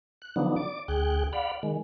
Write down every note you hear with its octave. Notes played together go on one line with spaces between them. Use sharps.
F#6
D3 F3 F#3 B3 D4 D#4
D5 D6
D2 G#4 G5 F#6
D5 F5 F#5 B5
D#3 G#3